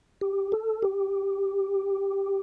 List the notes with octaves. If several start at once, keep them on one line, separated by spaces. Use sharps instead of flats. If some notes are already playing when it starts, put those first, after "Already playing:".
G4
A4
G4